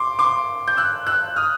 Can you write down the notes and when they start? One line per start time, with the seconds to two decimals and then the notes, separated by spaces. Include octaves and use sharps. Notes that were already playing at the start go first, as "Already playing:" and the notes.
Already playing: C6 D6
0.19 C6 D6
0.68 G6
0.77 E6 F#6
1.07 E6 F#6
1.36 D#6 F6